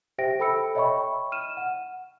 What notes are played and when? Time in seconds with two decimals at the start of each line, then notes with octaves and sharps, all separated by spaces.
0.18 G4 C5 E5 G5 A#6 D7
0.40 A4 G5 B5 E6 C#7
0.75 C#5 D#5 E5 G5 B5 C#6
1.32 F6 D#7 E7
1.57 F#5